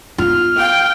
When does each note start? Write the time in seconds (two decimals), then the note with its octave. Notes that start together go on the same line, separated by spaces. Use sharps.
0.18 B3 F4 F6
0.59 F5 G5